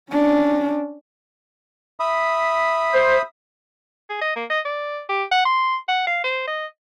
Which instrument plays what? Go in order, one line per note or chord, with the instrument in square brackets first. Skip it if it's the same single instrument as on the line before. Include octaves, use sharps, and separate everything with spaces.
[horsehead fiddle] C#4 D4
[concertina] E5 B5 D#6
[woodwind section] C5
[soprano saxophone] G#4
D#5
A#3
D#5
D5
G4
F#5
C6
F#5
F5
C5
D#5